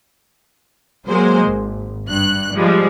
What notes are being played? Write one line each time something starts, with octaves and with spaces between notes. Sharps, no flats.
F#3 G#3 A#3 C5
G#1
G2 F#6
F3 G3 G#3